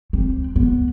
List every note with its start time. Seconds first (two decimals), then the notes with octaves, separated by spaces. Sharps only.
0.13 C4
0.56 B3